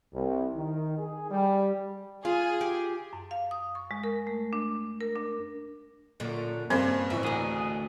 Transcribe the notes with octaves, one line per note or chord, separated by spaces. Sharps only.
C2
D#3
G#4
G3
F4 G#4
G4
F#2
F5
D#6
C#6
G#3
A#4
A3
D4
A#4
D4
F#2 A#2 D3
G2 C#3 A#3 C4 C5
A1 E3 E5 C#6
D2 D3 G#4 A#4